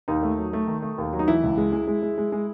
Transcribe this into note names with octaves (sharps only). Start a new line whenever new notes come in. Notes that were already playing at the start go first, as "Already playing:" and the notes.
D#2 D#4
A3
F#3
A3
D#3
A3
D#2
F#3
D#4
E3 E4
C#2
G#3
G#3
G#3
G#3
G#3
G#3